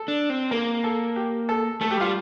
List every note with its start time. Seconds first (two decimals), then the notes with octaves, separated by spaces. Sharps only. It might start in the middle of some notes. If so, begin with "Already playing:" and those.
Already playing: A4
0.08 D4
0.30 C4
0.51 A#3 A#4
0.84 A4
1.16 G4
1.49 A4
1.81 A3 A4
1.91 G4
1.97 G3 F4